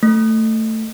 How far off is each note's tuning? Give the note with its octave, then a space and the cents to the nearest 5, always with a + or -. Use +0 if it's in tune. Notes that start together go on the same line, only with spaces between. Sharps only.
A3 +15